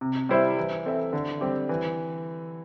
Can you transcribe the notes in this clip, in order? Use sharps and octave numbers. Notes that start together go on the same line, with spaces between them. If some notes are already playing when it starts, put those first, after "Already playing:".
C3
G3 E4 C5 E5
E3
C4 A4 E5
D3
G3 C4 G4
E3